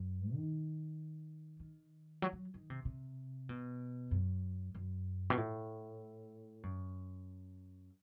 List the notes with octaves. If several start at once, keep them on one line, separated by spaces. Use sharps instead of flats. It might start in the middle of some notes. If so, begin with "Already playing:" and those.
Already playing: F#2
D#3
D#3
F#3
F#3
D#3
C3
C3
B2
F#2
F#2
B2
A2
F#2